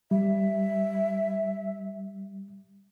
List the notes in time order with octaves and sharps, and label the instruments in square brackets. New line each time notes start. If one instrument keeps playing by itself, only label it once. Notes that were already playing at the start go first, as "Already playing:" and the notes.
[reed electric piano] G3 [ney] E5